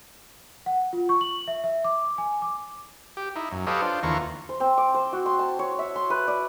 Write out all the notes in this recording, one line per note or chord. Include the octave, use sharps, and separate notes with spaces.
F#5
F4
C#6
F#7
E5
E5
D6
G#5
D6
G4
D#4 E4
F#2
G4 A4 B4 C#5 D#5 F5
D4 F4 C5
D#2 D3 E3 F4 A#5 C#6
C5
C4
D6
C5
F#4
C6
A5
C#5
E5
C6
B4
D5